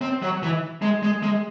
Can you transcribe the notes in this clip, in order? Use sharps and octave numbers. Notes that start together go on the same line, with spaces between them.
C4
F#3
E3
G#3
G#3
G#3